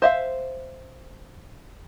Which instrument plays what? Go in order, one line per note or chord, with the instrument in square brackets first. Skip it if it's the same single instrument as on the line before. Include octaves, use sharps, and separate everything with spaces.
[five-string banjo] C5 E5 F5